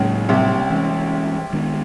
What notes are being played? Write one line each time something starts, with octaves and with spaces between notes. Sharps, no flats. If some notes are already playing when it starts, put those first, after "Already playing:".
Already playing: C#2 A2 C#3 F#3 A#3
C2 C3
E3 G#3 C#4
D#3 G#3 B3 D4